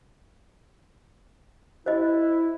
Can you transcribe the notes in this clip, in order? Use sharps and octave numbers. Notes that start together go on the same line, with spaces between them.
E4 C5 D#5